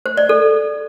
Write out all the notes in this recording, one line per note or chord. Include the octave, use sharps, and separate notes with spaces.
C5
D5
A4